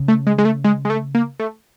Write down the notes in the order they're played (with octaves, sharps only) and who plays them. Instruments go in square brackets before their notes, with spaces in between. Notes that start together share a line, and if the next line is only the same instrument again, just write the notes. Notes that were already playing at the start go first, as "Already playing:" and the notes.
Already playing: [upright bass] C#3
[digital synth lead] A3
G#3
G#3
A3
G#3
G#3
A3
A#3
A3